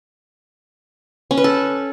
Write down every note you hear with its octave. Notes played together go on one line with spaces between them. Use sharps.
C#4
B4
A4